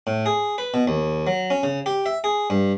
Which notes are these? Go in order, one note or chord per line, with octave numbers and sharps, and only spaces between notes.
A2
G#4
B4
B2
D#2
F#3
C#4
C#3
G4
E5
G#4
G2